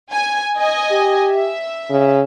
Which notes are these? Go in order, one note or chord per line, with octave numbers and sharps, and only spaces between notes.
G#5
D#5 G#5
G4
E5
C#3